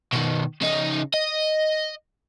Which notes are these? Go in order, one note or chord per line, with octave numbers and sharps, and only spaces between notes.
B2 D#3
C#3 D#4
D#5